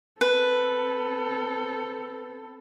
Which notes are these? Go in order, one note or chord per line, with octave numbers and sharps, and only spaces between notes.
C4 A4 B4